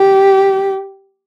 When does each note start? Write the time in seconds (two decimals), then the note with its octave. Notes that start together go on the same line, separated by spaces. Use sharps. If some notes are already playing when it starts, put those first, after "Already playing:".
Already playing: G4